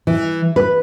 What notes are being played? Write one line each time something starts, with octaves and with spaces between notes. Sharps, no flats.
E3
B4